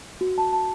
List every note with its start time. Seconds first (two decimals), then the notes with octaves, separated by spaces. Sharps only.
0.21 F#4
0.38 A5
0.53 A5